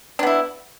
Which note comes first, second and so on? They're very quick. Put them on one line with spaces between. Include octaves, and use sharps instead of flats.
D4 B3 E4